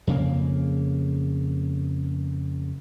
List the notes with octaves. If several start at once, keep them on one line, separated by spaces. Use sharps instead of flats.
F2 C#3 A#3